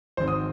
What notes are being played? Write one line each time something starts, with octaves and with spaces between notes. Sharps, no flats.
G#1 G#2 D#3 G#3 C4 C5
D#6